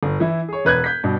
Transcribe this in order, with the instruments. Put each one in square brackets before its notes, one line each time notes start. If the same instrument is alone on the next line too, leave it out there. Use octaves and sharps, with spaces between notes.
[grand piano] G1
E3 E4
G#4 C#5
E1 B4 F#6 G#6
G6 B6
G2 B2